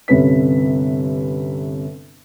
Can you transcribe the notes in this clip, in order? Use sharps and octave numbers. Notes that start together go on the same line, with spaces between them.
G1 C3 C#4 B4 B6